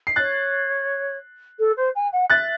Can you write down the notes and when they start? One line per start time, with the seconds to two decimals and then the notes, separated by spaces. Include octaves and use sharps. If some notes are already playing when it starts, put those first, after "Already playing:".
0.07 C7
0.16 C#5 F#6 A6
1.59 A4
1.76 C5
1.95 G#5
2.12 F#5
2.30 E5 F#6 A6